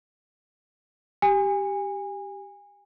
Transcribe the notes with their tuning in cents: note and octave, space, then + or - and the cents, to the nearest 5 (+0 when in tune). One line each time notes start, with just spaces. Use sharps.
G4 +0 G#5 -30